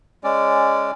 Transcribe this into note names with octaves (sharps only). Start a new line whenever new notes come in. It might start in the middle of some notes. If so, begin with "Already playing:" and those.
G#3 C#4 D5